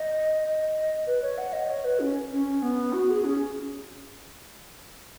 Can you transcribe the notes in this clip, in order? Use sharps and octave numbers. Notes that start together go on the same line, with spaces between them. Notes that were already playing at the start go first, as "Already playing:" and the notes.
Already playing: D#5
D#5
B4
C#5
F#5
D#5
C#5
B4
C#4
C#4
B3
F#4
G#4
C#4